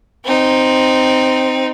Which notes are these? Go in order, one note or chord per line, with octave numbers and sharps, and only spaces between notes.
C4 D#4